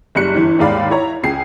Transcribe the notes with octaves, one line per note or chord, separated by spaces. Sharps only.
F#1 G3 F#6 C#7
G1 E3
D#2 G#2 D5 F5 B5
E4 C#5 A#5
C#2 G#4 C7